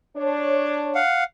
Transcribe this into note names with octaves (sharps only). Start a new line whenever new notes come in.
D4 C#5
F5 F#5